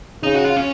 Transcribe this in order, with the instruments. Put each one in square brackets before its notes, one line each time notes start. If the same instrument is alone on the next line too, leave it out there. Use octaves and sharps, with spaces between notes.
[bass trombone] C#3 [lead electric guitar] D#4
[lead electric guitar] F#4
F4
C#4